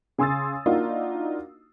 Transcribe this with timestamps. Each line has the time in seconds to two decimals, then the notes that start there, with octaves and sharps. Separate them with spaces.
0.18 C#3 G#5 C6 D#6 E6 A6
0.66 A#3 D4 D#4 F4 F#4